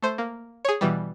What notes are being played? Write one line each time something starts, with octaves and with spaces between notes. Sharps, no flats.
A3 C5
A#3
G#4 C#5
B2 E3 G3